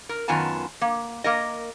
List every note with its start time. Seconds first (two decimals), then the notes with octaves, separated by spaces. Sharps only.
0.09 A#4
0.28 F#2 D#3 B3 F4 G#5 A5
0.81 A#3
1.24 A#3 A#4 D#5